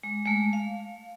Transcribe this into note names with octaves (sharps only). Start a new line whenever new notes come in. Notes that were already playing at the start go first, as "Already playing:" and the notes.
G#3
G#3 A3
F5